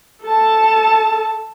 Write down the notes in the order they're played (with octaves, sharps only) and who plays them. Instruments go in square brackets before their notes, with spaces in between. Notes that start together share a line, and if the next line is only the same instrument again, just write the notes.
[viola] A4 A5